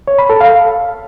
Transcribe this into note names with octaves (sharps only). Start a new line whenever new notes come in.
C#5
B5
A4
F5